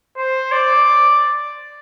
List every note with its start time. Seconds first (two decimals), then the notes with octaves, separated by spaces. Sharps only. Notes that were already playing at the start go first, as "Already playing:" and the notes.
0.17 C5
0.52 D5